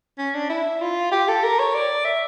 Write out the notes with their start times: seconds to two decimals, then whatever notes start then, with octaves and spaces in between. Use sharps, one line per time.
0.18 C#4
0.34 D4
0.50 E4
0.81 F4
1.11 G4
1.28 A4
1.44 A#4
1.59 C#5
1.74 D5
2.05 E5